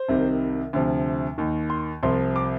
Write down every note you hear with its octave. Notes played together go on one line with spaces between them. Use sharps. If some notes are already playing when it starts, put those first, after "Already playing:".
Already playing: C5
C2 C3 D#3
D2 C3 F3
D#2 D#3
C6
C2 C3 F3 C6
D6